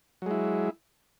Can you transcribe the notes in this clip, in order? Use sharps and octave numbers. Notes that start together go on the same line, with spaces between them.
F#3 G#3 E4